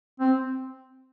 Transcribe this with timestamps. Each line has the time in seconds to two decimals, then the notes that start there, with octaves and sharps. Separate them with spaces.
0.20 C4